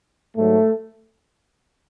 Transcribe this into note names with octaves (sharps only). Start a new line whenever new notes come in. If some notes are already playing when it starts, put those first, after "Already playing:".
G#2 F#3 A3